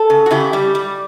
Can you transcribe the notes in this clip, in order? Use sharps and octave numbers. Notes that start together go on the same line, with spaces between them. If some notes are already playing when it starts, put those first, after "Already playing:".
Already playing: A4
C#3
F#4
C#3 E4 G4
G3
G3